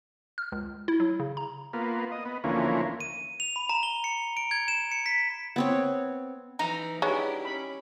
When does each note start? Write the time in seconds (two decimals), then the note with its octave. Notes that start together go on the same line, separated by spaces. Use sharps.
0.38 F6
0.52 C#2
0.88 E4
1.00 F#3
1.19 C#3
1.37 A#5
1.73 A#3 B3 F4
2.11 D#5
2.25 B3
2.44 D2 E3 F3 A#3 C#4
3.00 D#7
3.40 F7
3.56 B5
3.69 A#5
3.83 G7
4.04 C#7
4.37 D7
4.51 G#6
4.68 E7
4.92 C#7
5.06 B6
5.56 B3 C4 C#5
6.59 E3 D#4 A#5
7.02 G#3 B3 D4 E4 G4 C#5
7.45 C#4 B5